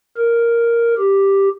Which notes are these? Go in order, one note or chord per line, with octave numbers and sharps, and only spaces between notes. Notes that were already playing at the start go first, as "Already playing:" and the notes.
A#4
G4